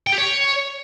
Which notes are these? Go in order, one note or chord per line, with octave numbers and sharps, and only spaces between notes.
G5
G4
C#5